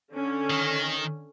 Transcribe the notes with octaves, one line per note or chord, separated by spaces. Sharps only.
D3 C#4
D#3